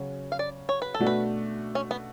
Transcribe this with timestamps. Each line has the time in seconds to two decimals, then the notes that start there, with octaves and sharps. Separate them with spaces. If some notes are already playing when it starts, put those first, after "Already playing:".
Already playing: C#3 F#3 C#4 F#4
0.32 F5
0.39 D5
0.69 C#5
0.82 B4
0.94 A4
1.00 B2 A3 D4 F#4
1.07 B4
1.75 C#4
1.91 B3